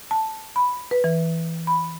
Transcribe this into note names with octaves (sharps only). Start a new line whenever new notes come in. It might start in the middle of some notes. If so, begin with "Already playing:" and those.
A5
B5
B4
E3
B5